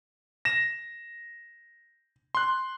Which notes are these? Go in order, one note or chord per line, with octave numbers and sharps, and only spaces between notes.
A#6 E7
C6 F#6